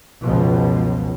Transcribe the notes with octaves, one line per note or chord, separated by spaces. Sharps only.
C#2 F#2 B2 F3